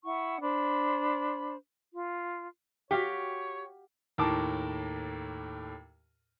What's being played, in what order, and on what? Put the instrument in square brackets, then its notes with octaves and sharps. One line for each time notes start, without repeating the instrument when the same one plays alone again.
[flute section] E4 F#5 C#6
D4 C5 B5
F4
[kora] F#4 F5 F#5 [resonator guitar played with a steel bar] G4 [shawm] C#5
[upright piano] D#2 A2 A#4 A5 D6